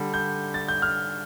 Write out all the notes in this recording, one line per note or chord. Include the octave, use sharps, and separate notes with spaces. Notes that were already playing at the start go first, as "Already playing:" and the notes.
Already playing: D3 G3
G6
A6
G6
F6